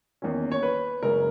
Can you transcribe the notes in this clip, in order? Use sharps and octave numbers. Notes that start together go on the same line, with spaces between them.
E2 D#3 A#3 C#4
C#5
B4
F#1 F#2 C#3 G#3 A#4